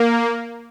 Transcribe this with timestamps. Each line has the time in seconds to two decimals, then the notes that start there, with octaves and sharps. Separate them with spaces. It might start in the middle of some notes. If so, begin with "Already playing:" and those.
Already playing: A#3